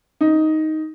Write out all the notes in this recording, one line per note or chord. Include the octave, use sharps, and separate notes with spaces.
D#4